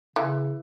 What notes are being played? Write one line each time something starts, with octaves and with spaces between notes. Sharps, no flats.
C#3 E3